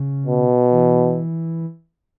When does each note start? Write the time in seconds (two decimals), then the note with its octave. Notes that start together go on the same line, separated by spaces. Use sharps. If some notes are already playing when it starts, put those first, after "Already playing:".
Already playing: C#3
0.26 B2
0.71 E3